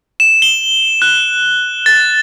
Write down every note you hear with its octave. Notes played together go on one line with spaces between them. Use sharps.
E7
G7
F#6
A6